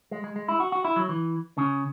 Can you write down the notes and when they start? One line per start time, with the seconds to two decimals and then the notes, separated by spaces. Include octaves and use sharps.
0.11 G#3
0.24 G#3
0.36 G#3
0.48 E4
0.60 F#4
0.72 F#4
0.85 E4
0.96 F#3
1.09 E3
1.58 C#3